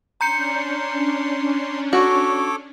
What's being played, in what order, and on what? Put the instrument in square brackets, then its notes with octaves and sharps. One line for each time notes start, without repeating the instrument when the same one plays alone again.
[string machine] C#4 D4 [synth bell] A#5 G6 C#7 [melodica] C6
[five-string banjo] F#4 [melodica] A4 C#5 D6